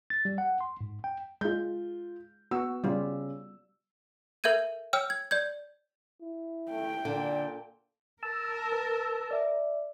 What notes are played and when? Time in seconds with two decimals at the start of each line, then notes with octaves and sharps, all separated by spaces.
0.10 A6
0.25 G3
0.38 F#5
0.61 C6
0.81 G#2
1.04 G5
1.41 G#3 F4 G6
2.51 B3 F#4 E6
2.84 C#3 G3 F4
4.44 A4 A#4 E5 G6 G#6 D#7
4.93 C#5 G5 E6 F6
5.10 G#6
5.31 D5 G6 G#6
6.22 E4
6.71 A3 G5
7.05 A#2 D3
8.23 A#4 A5 E6
8.72 B4
9.31 D5 E5